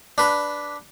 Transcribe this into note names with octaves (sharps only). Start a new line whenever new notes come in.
D4 B4